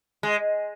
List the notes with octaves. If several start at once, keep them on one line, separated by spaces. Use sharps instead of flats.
G#3